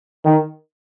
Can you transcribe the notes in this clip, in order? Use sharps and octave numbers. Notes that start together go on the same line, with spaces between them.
D#3